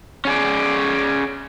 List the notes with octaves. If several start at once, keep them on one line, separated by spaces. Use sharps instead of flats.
C#4 G#4 D5